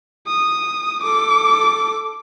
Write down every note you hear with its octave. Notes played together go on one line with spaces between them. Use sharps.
D#6
A4 D6